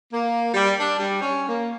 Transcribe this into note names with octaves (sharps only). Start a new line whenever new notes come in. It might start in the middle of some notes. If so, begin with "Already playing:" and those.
A#3
G3
D4
G3
C#4
A#3